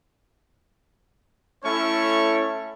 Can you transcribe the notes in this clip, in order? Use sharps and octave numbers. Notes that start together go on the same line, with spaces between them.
A3 C#4 E4 A4 C#5 C#6